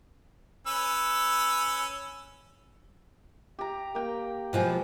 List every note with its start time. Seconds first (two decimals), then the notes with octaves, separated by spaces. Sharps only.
0.67 C#4 B4 E6
3.59 G4 A#5
3.95 A#3 G5
4.53 B2 F3 G#3